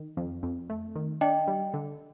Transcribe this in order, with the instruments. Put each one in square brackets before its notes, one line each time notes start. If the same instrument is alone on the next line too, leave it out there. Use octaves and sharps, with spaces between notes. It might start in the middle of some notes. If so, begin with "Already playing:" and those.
Already playing: [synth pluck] D#3
F2
F2
A3
D#3
[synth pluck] D4 [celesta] D#5 G5
[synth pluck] G3
D3